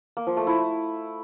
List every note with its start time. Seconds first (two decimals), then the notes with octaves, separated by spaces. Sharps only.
0.17 A#3
0.27 F3
0.37 A3
0.47 E4